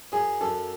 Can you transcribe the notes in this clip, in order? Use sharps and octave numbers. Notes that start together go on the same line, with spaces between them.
F#2 G#4
F#2 A4